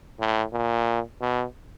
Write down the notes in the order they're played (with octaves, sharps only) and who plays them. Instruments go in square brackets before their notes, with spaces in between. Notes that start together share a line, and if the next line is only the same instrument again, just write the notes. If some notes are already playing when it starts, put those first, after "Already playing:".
[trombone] A2
A#2
B2